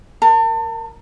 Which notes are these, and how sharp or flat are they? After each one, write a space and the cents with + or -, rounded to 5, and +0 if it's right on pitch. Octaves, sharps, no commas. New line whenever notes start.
A#4 +0 A5 +35